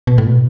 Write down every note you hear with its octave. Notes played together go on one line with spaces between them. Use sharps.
B2
A2
B2